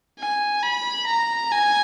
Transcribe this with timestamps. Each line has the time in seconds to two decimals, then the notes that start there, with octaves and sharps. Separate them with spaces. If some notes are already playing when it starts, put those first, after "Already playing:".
0.19 G#5
0.63 B5
1.06 A#5
1.51 G#5